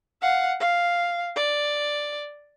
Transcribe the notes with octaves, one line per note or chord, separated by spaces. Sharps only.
F5 F#5
F5
D5